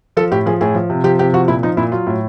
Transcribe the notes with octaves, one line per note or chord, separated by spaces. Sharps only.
F3 A4
A2 G4
F3 G#4
A2 G#4
F3
C3
F3 G4
C3 G4
F3 F#4
A#2 E4
F3 D#4
A#2 E4
F#3 F4
A2